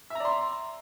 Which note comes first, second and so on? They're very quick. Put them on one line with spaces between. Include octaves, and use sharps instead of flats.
E5 A#5 D5 C6